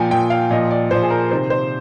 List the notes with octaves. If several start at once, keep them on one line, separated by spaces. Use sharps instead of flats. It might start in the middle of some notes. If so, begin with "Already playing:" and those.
Already playing: A#2 F3 G5 G#5
A#2 F3 G5
F5
A#2 F3 D#5
D5
A#2 F3 C5
G#4
A#4
C3 D#3 C5
C5